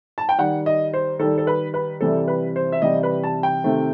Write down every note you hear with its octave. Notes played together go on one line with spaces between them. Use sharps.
A5
G5
D#3 G3 F#5
D#5
C5
D#3 G3 A4
A4
B4
B4
C3 E3 G3 A4
B4
C5
E5
C3 E3 G3 D#5
B4
A5
G5
C3 D#3 A3